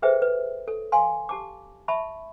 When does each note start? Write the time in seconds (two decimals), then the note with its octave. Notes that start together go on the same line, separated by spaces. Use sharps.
0.02 G#4 A4 B4 C5 E5 G5
0.22 B4
0.68 A4
0.92 F5 G#5 C6
1.29 G4 A5 D6
1.88 E5 A5 B5 C#6